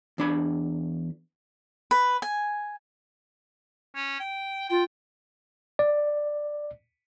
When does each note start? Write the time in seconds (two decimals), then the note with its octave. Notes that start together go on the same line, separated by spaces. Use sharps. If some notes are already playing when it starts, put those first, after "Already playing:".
0.18 E2 D4 B5
1.91 B4
2.22 G#5
3.95 C#4
4.20 G5
4.69 F4 G5
5.79 D5